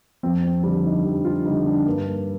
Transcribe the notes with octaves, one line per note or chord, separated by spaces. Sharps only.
F2 C4
C4
D3 G3 D4
D#4
F2 G4
F4
D3 G3 D#4
D4
G2 A#3
A#3